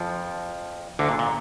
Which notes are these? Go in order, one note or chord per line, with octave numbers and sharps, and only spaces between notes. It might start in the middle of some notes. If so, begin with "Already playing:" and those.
Already playing: F2 F3
D2 D3
A#2
A#2